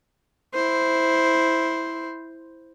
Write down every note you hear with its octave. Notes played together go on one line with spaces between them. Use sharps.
E4 C5